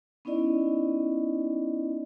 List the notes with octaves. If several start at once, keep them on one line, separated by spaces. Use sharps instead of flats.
B3 C#4 D#4 E4 D5 D#5